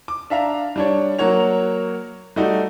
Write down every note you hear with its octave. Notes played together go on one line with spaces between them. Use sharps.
D6
D4 E5 F5 A#5 F7
G3 D4 C#5
F#3 A#3 F#4 C#5 F7
G3 A3 D#4 F#4